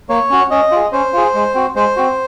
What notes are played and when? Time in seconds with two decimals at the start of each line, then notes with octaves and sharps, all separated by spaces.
0.09 A#3 C#5
0.30 C#4 F#4
0.51 C#4 D#5
0.71 F4 G#4
0.92 C#4 C5
1.13 F4 G#4
1.34 G#3
1.55 C4 F#4
1.75 G#3 C5
1.97 C4 F#4